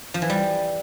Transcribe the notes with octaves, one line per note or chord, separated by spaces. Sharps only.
F3
E3
G3